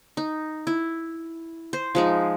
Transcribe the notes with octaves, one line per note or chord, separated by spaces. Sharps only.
D#4
E4
C5
F3 G#3 D#4